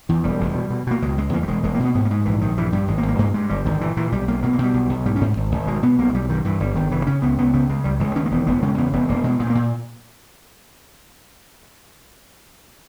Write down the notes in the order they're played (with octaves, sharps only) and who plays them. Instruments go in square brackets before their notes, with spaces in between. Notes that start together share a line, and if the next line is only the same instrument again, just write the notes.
[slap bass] E2 E3
E1 G3
E1
B2
B2
B2 A#3
C#2 G#3
C#2 G#3
E2 A#3
G3
E1 G#3
E1 G#3
A#3
B2 B3
G#2 B3
A#3
G#2 G#3
A#1 E3
A#1 D#3
G2 E3
G2 G3
G#1 G#3
A#3
G#1
A#3
G2 A#3
G2 G#3
G1 G3
G1 D#3
A#2 E3
A#2 E3
B1 G3
B1 A#3
B2 A#3
A#3
B2 G3
B1
B1
G#2 G3
C#4
G#2
G#1
G#1
B2 G#3
B2 B3
B1 A#3
G#3
B1 G3
G2 D#3
G2 E3
G1 G3
G1 D#3
C#3 E3
C#3 C#4
C#2 B3
C#2 B3
C#3 B3
C#3 G#3
C#2 G3
C#2 G#3
D#2 C#4
A#3
E1 B3
E1 B3
C#3 G#3
E2 B3
E1 B3
E1 A#3
B2 G#3
A#2 G#3
B3
A#3
A#2